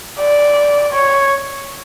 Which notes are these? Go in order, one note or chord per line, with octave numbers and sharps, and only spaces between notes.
D5
C#5